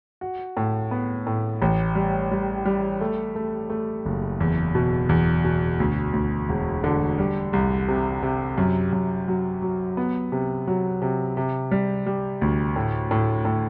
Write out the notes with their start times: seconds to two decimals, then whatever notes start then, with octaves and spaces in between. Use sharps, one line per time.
0.21 F#4
0.57 A2
0.91 B3
1.27 A2
1.62 A1
1.95 G3
2.31 G3
2.65 G3
3.01 A3
3.36 A3
3.70 A3
4.05 F#1
4.40 E2
4.75 B2
5.09 E2
5.44 B2
5.80 D2
6.13 D2
6.49 E1
6.84 D3
7.18 G3
7.53 C2
7.88 C3
8.23 C3
8.58 F#2
8.93 F#2
9.28 F#3
9.62 F#3
9.97 B3
10.32 C3
10.67 F#3
11.02 C3
11.37 C3
11.71 G3
12.06 G3
12.41 D2
12.76 A2
13.11 A2
13.45 A2